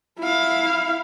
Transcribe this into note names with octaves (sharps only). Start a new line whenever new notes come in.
E4 F5